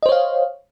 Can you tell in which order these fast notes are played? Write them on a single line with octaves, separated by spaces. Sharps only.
D#5 C5 C#5 F5